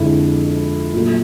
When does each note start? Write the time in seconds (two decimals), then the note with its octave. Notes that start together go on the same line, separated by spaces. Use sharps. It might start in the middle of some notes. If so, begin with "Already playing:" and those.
Already playing: F2 D3 F3 G#3 E4
0.94 A#2 F#3 A3